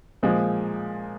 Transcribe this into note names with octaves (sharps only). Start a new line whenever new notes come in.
A#2 F3 G#3